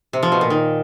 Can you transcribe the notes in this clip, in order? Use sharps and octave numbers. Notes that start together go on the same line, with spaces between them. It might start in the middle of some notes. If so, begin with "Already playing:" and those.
C3
F3
B2
A#2
D#3